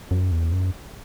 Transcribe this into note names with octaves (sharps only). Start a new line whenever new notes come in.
F#2
E2
F#2